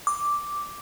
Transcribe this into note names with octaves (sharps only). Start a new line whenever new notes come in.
D6